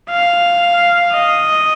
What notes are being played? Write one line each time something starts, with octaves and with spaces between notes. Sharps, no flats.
F5
D#5